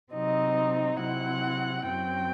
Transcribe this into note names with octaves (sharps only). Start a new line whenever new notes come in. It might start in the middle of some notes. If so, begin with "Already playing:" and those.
C3 F#3 C4 D#4 D#5
C3 F#3 C4 E4 F#5
F#2 F#3 C4 G5